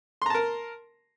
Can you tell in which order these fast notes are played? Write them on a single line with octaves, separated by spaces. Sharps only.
C6 A#5 A5 A#4